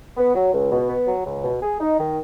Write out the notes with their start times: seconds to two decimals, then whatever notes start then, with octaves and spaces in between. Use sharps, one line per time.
0.17 B3
0.35 F#3
0.53 C#2
0.72 B2
0.89 B3
1.07 F#3
1.26 C#2
1.44 B2
1.63 G#4
1.81 D#4
1.99 D#3